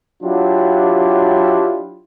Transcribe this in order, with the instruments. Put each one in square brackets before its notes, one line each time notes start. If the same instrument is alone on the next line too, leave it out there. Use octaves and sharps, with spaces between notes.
[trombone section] F#3 D4 E4 F4 G4